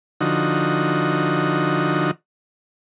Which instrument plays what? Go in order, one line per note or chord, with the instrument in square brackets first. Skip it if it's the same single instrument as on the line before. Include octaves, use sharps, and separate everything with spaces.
[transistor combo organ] D3 F3 D#4 F#4